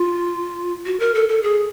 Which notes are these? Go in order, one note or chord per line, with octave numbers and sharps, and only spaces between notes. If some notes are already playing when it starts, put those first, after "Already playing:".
Already playing: F4
F#4
A#4
A4
A4
G#4